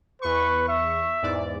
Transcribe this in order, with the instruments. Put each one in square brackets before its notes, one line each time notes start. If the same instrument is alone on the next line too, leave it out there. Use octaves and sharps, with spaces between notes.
[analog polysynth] E2 C#6 [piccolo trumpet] B4
[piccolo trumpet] E5
[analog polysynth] E2 G#2 D5